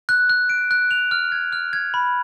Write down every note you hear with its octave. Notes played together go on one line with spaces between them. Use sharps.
F#6
F#6
D7
F#6
F7
F6
G#6
F6
G#6
B5